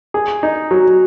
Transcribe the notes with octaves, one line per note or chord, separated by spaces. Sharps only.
G#4
D#4
F#3